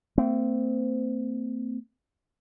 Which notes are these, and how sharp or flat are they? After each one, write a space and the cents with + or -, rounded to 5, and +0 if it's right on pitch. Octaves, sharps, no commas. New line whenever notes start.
A3 +45 C4 -25